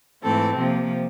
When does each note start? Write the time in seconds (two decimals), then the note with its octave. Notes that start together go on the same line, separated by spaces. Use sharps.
0.22 G#2 E3 A3 C4 A4
0.57 C3 F3 A#3